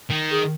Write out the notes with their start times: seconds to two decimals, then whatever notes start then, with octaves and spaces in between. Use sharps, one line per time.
0.10 D#3
0.31 G#4